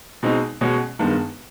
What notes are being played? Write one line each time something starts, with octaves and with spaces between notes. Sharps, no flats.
B2 G#3 C4 D#4
B2 G#3 C#4 F#4
G2 D#3 G#3 B3